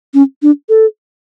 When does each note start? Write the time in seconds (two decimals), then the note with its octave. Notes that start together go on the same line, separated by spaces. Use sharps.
0.14 C#4
0.42 D4
0.69 A4